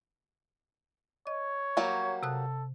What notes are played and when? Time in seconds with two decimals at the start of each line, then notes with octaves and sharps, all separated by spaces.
1.27 C#5 D#5
1.77 F#3 G3 A#3
2.23 C3 A4 D#6 F#6